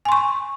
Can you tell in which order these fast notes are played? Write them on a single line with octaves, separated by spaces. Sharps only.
G#5 C6 C#6